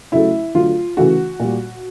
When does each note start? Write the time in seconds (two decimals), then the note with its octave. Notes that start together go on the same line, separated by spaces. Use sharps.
0.12 C#3 F#3 A3 E4
0.55 D3 F#3 A3 F4
0.97 C#3 E3 A3 F#4
1.40 A#2 G3